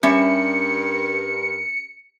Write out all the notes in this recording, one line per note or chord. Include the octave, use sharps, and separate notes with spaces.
G2 G3 C#4 A#4 E5 C#7